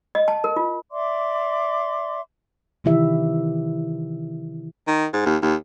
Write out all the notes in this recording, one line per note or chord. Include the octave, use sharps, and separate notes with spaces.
D#5
A5
A#4
F4
D5 E5 C6 D6
C3 D#3 E3 E4 G4 E5
D#3
G#2
D#2
D#2